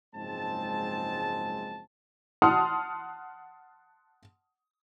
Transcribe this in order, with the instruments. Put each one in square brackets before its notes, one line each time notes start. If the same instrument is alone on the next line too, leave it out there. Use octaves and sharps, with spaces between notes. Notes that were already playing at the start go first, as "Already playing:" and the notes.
[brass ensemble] F#1 G#2 F3 G#3 C4 A5
[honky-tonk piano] F#5 A5 C6 D#6 F6